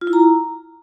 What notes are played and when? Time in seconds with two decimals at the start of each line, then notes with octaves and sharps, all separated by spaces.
0.01 F4
0.07 E4
0.13 A#5